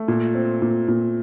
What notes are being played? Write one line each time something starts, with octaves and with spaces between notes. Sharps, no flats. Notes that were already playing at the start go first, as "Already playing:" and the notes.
Already playing: A3
A#2
C4
A#2
A#2